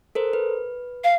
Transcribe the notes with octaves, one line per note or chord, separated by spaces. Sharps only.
A4 A#4 C5
B4
F5